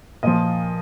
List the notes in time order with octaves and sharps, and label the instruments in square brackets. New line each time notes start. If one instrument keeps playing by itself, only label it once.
[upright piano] A#2 F3 D#5